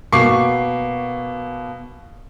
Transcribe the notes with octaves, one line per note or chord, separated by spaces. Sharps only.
B2 A#3 C#6 D6 C7